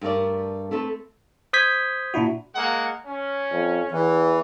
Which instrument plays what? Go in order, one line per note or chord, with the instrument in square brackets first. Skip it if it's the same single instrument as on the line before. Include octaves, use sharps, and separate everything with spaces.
[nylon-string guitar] G2 A3 D4 A#4 D5
A3 C4 A4 B4
[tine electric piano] C5 D#6 G6 G#6 B6
A#2 D4 E4 F#4
[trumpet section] G#3 A#3 F#5
C#4
[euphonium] F2
[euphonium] E2 [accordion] E3